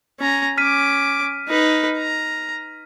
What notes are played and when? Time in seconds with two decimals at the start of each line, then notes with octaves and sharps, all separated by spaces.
0.20 C#4 A#5
0.58 C#4 D6 F6 B6 D#7
1.48 D#4 B4
1.97 A#5